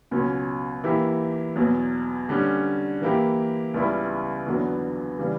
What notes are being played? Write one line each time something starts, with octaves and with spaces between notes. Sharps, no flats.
C#2 B2 F#3 C#4
E3 A#3 E4 G4
E2 B2 F#3
D3 G3 C#4
E3 A#3 E4 G4
C#2 C#3 G3 B3 E4
E2 D3 F#3 B3
C#3 E3 G3